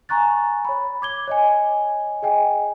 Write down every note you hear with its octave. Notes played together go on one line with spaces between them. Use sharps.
G#5 A#5 C#6 F#6 A6
C#5 B5
D6 G#6 G7
C#5 D#5 G#5
G#4 D#5 G5 G#5